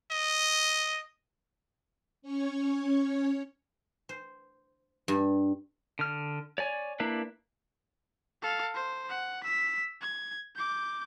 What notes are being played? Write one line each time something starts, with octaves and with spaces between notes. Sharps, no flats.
D#5
C#4 C#5
C5
G2
D3 F6
C#5 D5 G#5
A#3 D4 E4 B4
A4 F5
C5
F#5
E6 B6
G#6
D6 G6